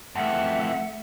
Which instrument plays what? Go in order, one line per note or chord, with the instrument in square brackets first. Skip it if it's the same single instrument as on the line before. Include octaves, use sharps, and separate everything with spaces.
[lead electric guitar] F2 E3 [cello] A3 E5 [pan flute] F#5